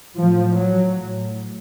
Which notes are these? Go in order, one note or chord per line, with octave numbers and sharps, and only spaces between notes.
A2 F3
F#3
A2